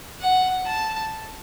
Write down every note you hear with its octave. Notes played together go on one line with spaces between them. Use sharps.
F#5
A5